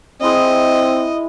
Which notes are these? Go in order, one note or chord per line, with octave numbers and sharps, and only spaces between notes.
G#3 C4 E4 D#5 E5